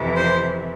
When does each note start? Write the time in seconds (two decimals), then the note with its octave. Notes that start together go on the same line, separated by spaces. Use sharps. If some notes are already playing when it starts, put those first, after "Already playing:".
Already playing: F2 C3 E3
0.16 C5